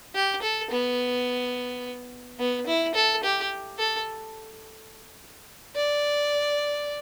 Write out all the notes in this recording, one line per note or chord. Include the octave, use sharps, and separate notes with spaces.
G4
A4
B3
B3
E4
A4
G4
A4
D5